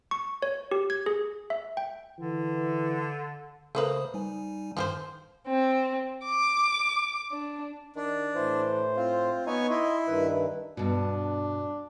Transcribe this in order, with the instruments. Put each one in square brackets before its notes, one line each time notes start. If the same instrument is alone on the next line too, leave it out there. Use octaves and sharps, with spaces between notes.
[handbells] C#6
C#5
G4
G#6
G#4
E5
G5
[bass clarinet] D3 [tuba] E3
[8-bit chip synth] C#3 C5 D#6 [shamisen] A3 A#3 B4
[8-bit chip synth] G3 D#4 G#5
[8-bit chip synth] G2 D#3 [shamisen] F3 G4 C5
[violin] C4
D6
D4
[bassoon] D#3 [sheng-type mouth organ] D4
[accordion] A2 C5 [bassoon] E3
[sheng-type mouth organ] C4 [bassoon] F4
[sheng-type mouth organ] B3 C#5 G#5 [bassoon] D#4
[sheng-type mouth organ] E4 [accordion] D#5 C6
[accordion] G2 D#3 [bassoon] B4
[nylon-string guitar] G2 B2 [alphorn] D4